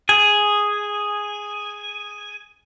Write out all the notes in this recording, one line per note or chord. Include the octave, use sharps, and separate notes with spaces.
G#4 G#5